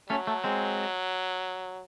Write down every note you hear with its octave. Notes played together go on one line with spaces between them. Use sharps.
F#3 A3 C#4
A3
G#3 C4